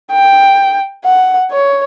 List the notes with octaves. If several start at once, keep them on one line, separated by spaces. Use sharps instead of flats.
G5
F#5
C#5